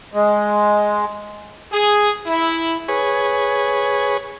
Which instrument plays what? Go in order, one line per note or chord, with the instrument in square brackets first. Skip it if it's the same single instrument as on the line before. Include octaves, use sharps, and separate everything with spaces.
[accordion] G#3
[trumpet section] G#4
E4
[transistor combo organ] G#4 B4 C#5